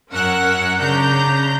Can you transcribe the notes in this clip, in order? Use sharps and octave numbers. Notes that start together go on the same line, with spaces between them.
F#2 C#4 A#4 F#5 E6 F#6
C#3 D4 A#5 G6